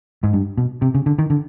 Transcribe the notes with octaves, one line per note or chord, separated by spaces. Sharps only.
G#2
G2
B2
C3
C#3
D3
D#3
D3